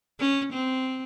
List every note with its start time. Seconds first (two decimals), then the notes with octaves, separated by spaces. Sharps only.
0.19 C#4
0.53 C4